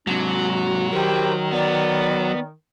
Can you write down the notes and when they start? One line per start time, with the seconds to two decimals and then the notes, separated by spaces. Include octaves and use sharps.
0.07 G#2 C3 F#3 D4
0.37 F#4
0.93 D#3 G4 A#4 C5
1.52 B3 D5